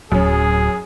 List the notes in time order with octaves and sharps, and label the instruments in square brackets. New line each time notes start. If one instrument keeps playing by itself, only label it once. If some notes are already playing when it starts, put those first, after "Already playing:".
[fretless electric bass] D1 [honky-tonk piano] F#2 C#4 [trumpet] G#4